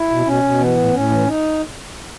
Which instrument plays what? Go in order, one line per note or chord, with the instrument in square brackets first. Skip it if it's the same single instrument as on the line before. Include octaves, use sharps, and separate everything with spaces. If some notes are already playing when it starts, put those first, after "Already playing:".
Already playing: [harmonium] E4
B2
B2 C#4
B2
E3 B3
A2
A2 C#4
E3
D#4